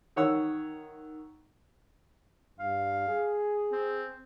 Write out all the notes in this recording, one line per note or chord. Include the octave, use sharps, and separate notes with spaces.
D#3 C#5 F#5 E6
G2 F5
G#4
C4